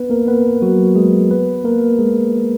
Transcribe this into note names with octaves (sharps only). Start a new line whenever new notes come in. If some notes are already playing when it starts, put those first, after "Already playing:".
Already playing: B3 B4
A#3 A#4
B3 B4
F#3 F#4
G#3 G#4
B3 B4
A#3 A#4
G#3 G#4